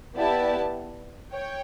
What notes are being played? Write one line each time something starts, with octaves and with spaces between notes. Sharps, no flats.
B3 E4 G4 D5 A5
C#5 G5